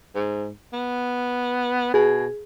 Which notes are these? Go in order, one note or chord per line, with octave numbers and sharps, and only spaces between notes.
G#2
B3
B2 G#4